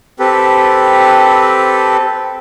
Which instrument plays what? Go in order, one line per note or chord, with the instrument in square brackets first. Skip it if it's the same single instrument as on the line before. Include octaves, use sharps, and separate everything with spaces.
[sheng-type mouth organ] C4 G4 A4 B4